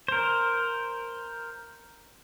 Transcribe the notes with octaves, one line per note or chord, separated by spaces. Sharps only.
A#4 C5